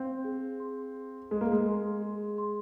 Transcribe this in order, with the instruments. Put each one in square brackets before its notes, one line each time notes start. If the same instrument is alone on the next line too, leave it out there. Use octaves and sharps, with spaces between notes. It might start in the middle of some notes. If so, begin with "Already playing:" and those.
Already playing: [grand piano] C4 [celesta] F5
[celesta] G#4
C6
G#4
[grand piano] G#3 [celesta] G#4
[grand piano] A#3
G#3
[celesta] C6
G#4
C6